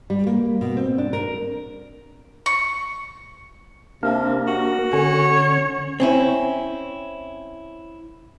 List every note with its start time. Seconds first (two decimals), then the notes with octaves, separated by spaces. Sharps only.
0.10 G3
0.27 A#3
0.61 B2
0.77 C4
0.98 D4
1.13 A#4
2.46 C#6
4.03 C3 A#3 D4 A#4
4.47 F#4
4.93 D3 C#4 C#5
6.00 C4 C#4 E4